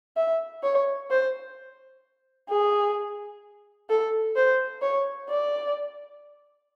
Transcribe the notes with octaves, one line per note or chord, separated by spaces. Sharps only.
E5
C#5
C5
G#4
A4
C5
C#5
D5